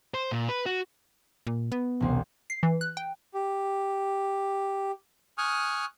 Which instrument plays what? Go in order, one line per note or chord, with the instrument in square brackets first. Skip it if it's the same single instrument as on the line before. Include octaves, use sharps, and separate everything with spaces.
[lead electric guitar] C5
A#2
B4
F#4
[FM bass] A#2
B3
[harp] E1 C2 C4
[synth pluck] C7
E3
F#6
G5
[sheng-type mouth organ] G4
G#5 C#6 D#6 F6 F#6